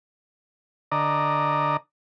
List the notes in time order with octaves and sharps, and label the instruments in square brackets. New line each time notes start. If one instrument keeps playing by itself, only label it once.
[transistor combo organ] D3 D5 D#5 A#5